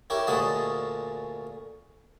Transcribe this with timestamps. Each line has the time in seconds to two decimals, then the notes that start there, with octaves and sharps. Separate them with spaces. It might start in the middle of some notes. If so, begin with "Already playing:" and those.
0.10 E4 G4 A#4 C#5
0.27 D2 A#2 G#3 F#4 D#5 A5